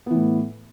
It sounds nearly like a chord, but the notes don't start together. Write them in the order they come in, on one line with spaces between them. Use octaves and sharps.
B3 E3 A2